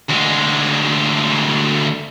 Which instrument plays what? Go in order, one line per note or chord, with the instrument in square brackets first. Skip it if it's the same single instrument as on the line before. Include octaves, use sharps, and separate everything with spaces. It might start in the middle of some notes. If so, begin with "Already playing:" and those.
[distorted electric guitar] D2 G#3